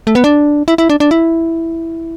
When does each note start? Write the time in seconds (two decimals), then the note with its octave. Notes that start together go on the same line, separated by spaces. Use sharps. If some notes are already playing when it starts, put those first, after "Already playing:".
0.07 A3
0.15 B3
0.24 D4
0.68 E4
0.78 E4
0.89 D4
1.00 D4
1.11 E4